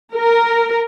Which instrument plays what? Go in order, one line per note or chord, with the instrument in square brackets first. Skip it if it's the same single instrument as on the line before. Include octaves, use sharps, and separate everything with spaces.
[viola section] A#4